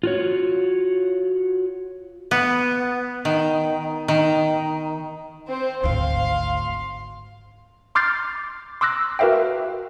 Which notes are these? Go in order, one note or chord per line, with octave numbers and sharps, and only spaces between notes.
F4 F#4 C#5
B3
D#3
D#3
C4 C5
G#1 D2 F5 C6
C6 D6 F6 G6 A6 C7
C6 D6 E6 F#6 A#6
F#4 A#4 B4 E5 F5 G5